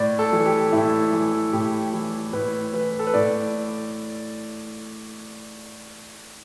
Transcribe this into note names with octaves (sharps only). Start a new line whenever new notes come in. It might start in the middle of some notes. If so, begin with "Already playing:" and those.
Already playing: A2 D5
A4
E3
G4
A2 E4
E3
A2 G4
E3
A2 B4
E3 B4
A4
B4
A2 D5